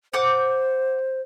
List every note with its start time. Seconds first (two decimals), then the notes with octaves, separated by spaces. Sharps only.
0.14 C5 F#5 D6 G6